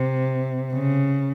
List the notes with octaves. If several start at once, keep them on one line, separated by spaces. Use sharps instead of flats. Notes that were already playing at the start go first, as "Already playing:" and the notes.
Already playing: C3
C#3